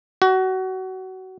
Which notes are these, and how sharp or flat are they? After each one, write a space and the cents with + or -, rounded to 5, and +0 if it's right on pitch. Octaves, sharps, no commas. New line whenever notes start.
F#4 +25